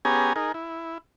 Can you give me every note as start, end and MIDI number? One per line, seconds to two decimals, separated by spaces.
0.05 0.33 59
0.05 0.33 61
0.05 0.33 67
0.05 0.33 68
0.05 0.33 80
0.05 0.33 82
0.36 0.52 63
0.36 0.52 68
0.36 0.52 70
0.54 0.98 64